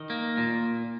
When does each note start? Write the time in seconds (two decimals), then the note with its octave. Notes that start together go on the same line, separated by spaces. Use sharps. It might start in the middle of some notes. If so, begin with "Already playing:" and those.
Already playing: D#3
0.10 A#3
0.37 A#2